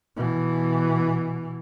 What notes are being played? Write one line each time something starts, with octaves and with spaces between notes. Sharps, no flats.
B2 E3